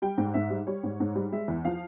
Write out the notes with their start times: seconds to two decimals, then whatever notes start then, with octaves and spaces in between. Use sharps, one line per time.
0.02 G3 G5
0.18 G#2
0.34 G#2 E5
0.50 G3
0.67 G3 C#5
0.83 G#2
1.00 G#2
1.15 G3
1.32 G#3 E5
1.48 E2
1.65 F3 F5